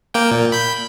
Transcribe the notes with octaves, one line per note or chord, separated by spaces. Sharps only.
A#3 G5
A#2
B5 G6